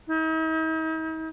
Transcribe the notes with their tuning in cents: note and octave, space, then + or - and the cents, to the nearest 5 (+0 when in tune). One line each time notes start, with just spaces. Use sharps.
D#4 +45